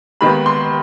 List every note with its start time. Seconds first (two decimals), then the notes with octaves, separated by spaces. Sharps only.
0.21 D#2 D#3 G#3 B3 B5
0.46 C6